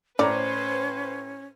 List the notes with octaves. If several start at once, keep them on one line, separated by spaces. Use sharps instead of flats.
A2 C#4 A4 B4 C5 D5 A#5